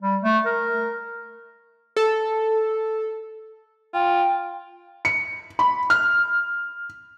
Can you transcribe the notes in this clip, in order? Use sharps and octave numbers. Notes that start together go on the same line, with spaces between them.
G3
A3
A#4
A4
F4 G5
C#7
B5
F6